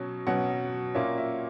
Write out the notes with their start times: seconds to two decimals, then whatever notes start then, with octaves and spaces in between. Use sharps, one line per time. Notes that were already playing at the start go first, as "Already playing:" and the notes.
Already playing: B2 F#3 C#4
0.27 B2 F#3 C#4 F#5
0.95 A#2 A#3 C#4 E5
1.18 E5